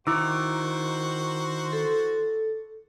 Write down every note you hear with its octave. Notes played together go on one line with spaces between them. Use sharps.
D#3 E4 F#4 C5 D6 E6
A4